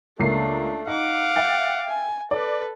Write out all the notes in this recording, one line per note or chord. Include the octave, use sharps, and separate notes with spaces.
C#2 A3 A#3 D4 C7
D#4 F5 F#5 D6
E5 G5 A6
G#5
A4 B4 D5